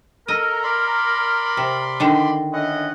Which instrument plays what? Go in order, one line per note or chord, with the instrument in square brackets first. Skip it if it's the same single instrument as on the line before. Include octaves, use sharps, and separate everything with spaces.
[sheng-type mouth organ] A4 [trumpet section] A#4 [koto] D#5
[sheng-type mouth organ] D5 B5 C6
[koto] C3
D3 D#3 D4
[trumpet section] C#4 E4 D#5 [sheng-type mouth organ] F#5